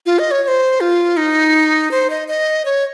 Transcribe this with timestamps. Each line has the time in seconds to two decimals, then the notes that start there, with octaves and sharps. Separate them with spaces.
0.06 F4
0.19 D#5
0.31 C#5
0.43 C#5
0.48 C5
0.81 F4
1.17 D#4
1.91 C5
2.10 D#5
2.28 D#5
2.65 C#5